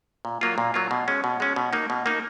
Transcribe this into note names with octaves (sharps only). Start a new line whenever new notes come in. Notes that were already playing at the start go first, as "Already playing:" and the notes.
A#2
F#3 A#3 F4
A#2
F#3 A#3 F4
B2
G#3 C#4
B2
G#3 C#4
B2
A#3 D#4
B2
A#3 D#4